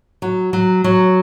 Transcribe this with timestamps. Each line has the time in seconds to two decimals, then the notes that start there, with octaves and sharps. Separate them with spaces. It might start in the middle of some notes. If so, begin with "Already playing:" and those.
0.22 F#3
0.53 F#3
0.84 F#3